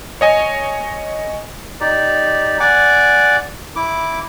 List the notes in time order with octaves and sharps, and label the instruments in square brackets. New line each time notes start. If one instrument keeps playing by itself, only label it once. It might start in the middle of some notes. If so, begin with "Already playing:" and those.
[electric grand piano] C#5 D#5 G#5
[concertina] D#4 G4 D5
D5 F#5 G#5 D6
E4 D6